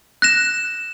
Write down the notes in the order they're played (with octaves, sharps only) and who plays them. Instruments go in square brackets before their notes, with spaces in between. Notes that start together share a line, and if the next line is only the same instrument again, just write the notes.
[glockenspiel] F#6 A#6 E7